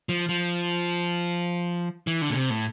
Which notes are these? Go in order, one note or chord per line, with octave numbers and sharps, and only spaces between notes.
F3
F3
E3
D3
A#2
C3
A2